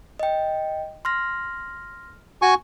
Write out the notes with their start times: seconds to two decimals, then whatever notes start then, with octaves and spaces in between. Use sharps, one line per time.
0.20 D#5 G5
1.05 C6 F6 A#6
2.42 F#4 G#5 C#6